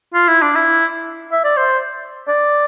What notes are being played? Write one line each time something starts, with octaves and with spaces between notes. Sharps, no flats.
F4
E4
D4
E4
E5
D5
C5
D5